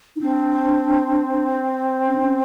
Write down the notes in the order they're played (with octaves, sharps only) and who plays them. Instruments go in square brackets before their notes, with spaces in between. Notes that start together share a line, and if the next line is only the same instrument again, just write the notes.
[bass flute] D#4
[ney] C4 [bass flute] D4
[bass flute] C#4
D4
C#4